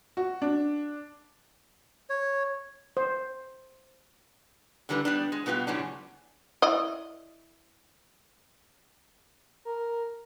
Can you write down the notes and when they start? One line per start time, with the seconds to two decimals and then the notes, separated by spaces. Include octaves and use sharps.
0.17 F#4
0.42 D4
2.10 C#5
2.97 C5
4.89 D3 E3 G3 D4 B4
5.05 G3 B3 D4
5.32 G#3
5.46 B2 G3 B3 F4 G4
5.67 F#2 A2 C#3 G3 C#4 D4
6.62 E4 D5 D#5
9.65 A#4